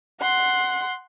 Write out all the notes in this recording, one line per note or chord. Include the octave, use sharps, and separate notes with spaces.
F#5 C6